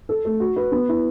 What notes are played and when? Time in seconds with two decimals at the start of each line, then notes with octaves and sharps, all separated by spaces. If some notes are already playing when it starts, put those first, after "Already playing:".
0.09 A4
0.25 A3
0.40 F#4
0.56 B4
0.72 B3
0.89 E4